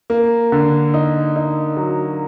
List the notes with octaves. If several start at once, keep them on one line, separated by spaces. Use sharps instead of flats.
A#3
D3
D#4
D#4
F#3